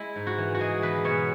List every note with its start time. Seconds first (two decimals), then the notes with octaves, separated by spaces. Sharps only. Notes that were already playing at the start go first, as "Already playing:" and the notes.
Already playing: G#3 E4
0.16 G#2
0.27 F#4
0.38 E3
0.54 F#4
0.60 G#3 G#4
0.82 E2 B4
1.04 B2 C#5